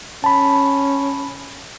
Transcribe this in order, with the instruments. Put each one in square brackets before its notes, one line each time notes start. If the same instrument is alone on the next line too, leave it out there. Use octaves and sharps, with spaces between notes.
[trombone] C#4 [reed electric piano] A5 B5